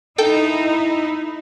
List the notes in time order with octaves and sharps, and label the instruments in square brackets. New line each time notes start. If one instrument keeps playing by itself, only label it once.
[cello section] D#4 E4 [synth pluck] A4 G5